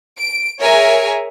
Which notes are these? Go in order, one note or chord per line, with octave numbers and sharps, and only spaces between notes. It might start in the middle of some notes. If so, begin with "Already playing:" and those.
D7
G#4 A#4 C#5 E5 G#5 A#5